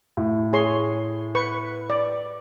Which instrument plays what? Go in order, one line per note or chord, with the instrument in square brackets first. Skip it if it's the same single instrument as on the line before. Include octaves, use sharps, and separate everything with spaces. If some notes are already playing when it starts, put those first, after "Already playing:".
[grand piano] A2
[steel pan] G#4 C#5 C6
B4 C#6
D5